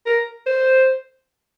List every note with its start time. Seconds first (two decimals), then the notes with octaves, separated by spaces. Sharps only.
0.06 A#4
0.46 C5